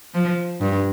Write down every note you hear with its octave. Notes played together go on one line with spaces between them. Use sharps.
F3
G2